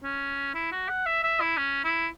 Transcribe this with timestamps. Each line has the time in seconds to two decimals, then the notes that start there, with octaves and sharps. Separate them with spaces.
0.03 C#4
0.55 E4
0.72 F#4
0.89 F#5
1.06 E5
1.23 E5
1.41 E4
1.57 C#4
1.84 E4